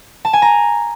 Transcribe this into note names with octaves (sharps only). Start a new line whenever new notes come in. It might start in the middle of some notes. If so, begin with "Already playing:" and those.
A5
G#5
A#5